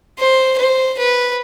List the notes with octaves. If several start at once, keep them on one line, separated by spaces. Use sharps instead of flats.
C5
C5
B4